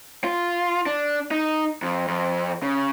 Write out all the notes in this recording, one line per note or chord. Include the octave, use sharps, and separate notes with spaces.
F4
D4
D#4
F2
F2
C#3